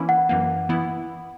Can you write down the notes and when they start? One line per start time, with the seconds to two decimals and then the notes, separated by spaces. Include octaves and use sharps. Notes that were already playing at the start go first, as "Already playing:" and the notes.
Already playing: E3 A#3 C#4 E4
0.09 F#5
0.29 F#2 E3 A#3
0.69 E3 B3 E4